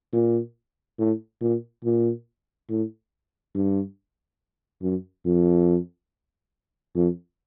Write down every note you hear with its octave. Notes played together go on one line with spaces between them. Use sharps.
A#2
A2
A#2
A#2
A2
G2
F#2
F2
F2